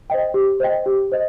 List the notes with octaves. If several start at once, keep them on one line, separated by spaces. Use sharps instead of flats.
C5 D#5 G5
G4
C5 D#5 G5
G4
C5 D#5